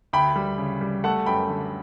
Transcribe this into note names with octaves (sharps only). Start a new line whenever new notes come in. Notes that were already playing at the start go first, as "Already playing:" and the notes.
D2 G5 B5
G3
C#3
G3
A3 F#5 A5
F#2 G5 B5
D3